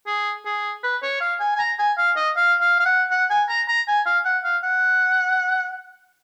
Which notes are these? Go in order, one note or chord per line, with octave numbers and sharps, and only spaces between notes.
G#4
G#4
B4
C#5
F5
G#5
G#5
A#5
G#5
F5
D#5
F5
F5
F5
F#5
F#5
G#5
A#5
A#5
G#5
F5
F#5
F5
F#5